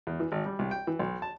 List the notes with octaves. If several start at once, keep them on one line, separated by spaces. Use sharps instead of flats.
E2
E3
G#1
G3
C2
G5
E3
B1
A5